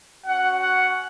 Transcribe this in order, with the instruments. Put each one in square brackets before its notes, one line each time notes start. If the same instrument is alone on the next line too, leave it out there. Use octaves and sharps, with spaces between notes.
[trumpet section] C#4 F#4 F#5
F#5